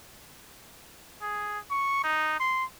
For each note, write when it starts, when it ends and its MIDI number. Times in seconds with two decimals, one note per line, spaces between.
1.22 1.59 68
1.71 2.01 85
2.04 2.36 63
2.40 2.65 84